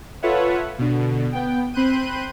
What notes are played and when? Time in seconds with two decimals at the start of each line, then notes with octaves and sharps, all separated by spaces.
0.22 F4 A4 B4 C#5 E5 F#5
0.79 B2 D3
1.32 B3 G5
1.74 C4 B5 C6 F#6 G6 D#7